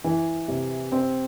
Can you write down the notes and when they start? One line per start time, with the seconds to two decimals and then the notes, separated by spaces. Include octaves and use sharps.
0.04 E3
0.48 C3
0.92 C4